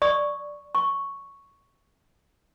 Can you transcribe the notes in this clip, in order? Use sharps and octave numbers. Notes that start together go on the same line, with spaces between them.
D5 C#6 D#6
C#6